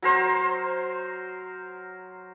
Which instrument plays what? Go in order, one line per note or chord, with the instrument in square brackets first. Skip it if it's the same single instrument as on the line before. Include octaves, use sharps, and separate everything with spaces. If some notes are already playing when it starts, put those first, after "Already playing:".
[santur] F#3 A#4 C5